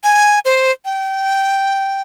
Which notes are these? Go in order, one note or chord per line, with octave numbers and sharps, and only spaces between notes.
G#5
C5
G5